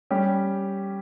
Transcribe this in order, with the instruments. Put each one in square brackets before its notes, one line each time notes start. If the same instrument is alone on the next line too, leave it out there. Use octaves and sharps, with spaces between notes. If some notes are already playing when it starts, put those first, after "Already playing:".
[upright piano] G3 C#4 G4